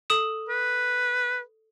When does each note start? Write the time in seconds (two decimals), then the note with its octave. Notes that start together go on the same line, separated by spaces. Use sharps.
0.10 A4 D#6 E7
0.49 B4